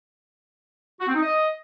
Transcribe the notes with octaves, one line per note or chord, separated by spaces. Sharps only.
F#4
C4
D#4
D#5